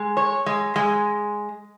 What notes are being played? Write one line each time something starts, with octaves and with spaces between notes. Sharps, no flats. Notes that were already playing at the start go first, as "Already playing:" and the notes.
Already playing: G#3
C#5
G#3
G#3